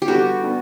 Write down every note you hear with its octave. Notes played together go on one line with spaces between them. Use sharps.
G4
D3 G3 B3 D4 F#4
B3 D4